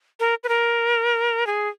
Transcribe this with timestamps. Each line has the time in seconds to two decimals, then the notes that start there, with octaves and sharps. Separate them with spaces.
0.20 A#4
0.44 B4
0.49 A#4
1.47 G#4